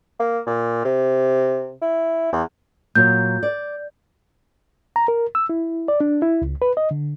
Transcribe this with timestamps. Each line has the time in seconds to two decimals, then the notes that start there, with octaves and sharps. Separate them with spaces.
0.20 A#3
0.47 A#2
0.85 C3
1.82 E4
2.32 E2
2.95 A#2 F#3 G6
3.43 D5
4.96 A#5
5.08 A#4
5.35 E6
5.49 E4
5.88 D5
6.01 D4
6.22 E4
6.42 C#2
6.62 B4
6.77 D#5
6.91 D3